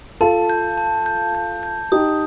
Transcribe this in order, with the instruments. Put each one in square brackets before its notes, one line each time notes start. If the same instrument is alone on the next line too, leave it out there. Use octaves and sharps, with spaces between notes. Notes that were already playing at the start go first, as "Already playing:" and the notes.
[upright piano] F4 A4 [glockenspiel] A5
[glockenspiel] G6
A5
G6
G6
G6
[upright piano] D#4 G4 [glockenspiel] D#6